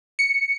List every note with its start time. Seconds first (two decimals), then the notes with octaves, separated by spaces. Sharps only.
0.19 C#7